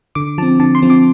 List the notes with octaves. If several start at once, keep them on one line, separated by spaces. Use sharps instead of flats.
D3 D6
F3 C4 A5
D3 A5
C6
F3 C4
D6